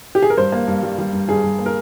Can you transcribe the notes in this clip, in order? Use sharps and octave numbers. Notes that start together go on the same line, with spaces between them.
G4
G#4
A#4
G2 C5
A#3
G2
G3
G3
G2
G2 G#4
G2
A#3
A#4